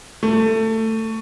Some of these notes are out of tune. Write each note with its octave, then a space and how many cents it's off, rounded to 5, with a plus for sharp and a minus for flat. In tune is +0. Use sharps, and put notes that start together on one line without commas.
A3 +20